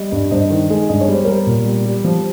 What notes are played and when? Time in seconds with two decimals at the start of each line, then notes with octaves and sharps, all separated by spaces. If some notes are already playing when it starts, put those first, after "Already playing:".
Already playing: G3 D#5
0.12 G2
0.31 G2 C5 D#5
0.50 D#3
0.70 G#3
0.89 G2 D#5
1.01 C#5
1.08 G3 C5
1.25 G3 A#4 C#5
1.46 A#2
1.66 G3
1.85 G3
2.04 F3